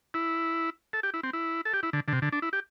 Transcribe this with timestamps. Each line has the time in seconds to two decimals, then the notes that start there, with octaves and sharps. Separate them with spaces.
0.14 E4
0.93 A4
1.03 G4
1.14 E4
1.23 C4
1.33 E4
1.65 A4
1.73 G4
1.83 E4
1.93 D3
2.08 D3
2.13 C3
2.22 D3
2.32 D4
2.42 E4
2.53 G4